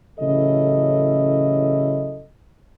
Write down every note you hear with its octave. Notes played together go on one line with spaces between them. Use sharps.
A1 C#3 F#3 E4 A4 D#5